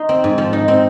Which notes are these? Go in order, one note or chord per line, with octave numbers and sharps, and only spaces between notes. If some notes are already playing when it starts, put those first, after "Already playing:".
Already playing: D#4 C6
C4
G#2
F3
D#4
C4